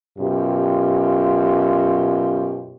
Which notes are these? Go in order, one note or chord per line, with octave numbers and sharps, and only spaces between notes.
F#2 B2 F4 G4